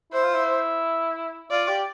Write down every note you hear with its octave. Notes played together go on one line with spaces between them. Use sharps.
E4 C5
F4
E4
F4 D5
G4